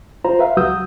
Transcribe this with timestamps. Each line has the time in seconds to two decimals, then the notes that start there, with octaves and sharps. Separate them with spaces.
0.24 F4 C5 A#5
0.39 B4 E5 F5
0.57 C#2 F#3 F#4 D#6 E6 G6